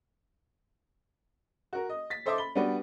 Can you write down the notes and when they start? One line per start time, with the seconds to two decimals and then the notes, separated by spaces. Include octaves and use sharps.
1.73 F#4 A#4
1.89 D#5
2.10 A6 B6
2.26 A4 C5 D#5 E5 C6 D6
2.38 B5 G7
2.55 G3 B3 D4 F#4 B4 D5